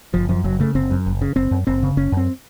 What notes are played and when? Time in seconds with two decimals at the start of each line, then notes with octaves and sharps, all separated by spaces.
0.14 F#1 F3
0.29 F#2 F3
0.44 F#1 F#3
0.60 C#3 A3
0.75 F#1 C4
0.91 F#2
1.06 F#1
1.22 C#3
1.36 F#1 C4
1.51 F#2
1.67 F#1 C4
1.83 C#3
1.97 F#1 C#4
2.12 F#2 C4